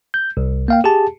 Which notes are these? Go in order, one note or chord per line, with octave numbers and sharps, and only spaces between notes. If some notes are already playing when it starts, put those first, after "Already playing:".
G6
C2
A#3 F5 G5
G4 G#4 A5